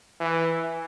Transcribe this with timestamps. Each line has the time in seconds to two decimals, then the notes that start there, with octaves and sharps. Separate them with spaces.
0.20 E3